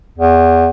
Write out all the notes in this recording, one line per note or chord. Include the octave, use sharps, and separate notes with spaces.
E2